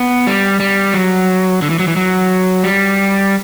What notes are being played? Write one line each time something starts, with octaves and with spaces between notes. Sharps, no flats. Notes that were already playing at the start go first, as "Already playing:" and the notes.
Already playing: B3
G3
G3
F#3
D3
E3
F#3
E3
F#3
G3